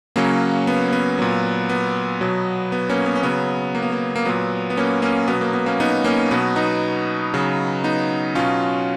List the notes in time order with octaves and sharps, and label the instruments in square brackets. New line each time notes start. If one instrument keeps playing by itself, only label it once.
[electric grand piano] C#3 F#3 A#3 C#4
B3
B3
A#2 F#3
B3
B2 F#3
B3
A#3 C#4
B3
C#4
C#3 F#3 B3
A#3
B3
A#3
A#3
A#2 F#3 B3
B3
A#3 C#4
A#3 C#4
B2 F#3 B3
A#3
B3
A#3 C#4
B3 D#4
A#3 C#4
B2 F#3 B3
B3 D#4
C#3 F#3
B3 D#4
B2 F#3 C#4 F4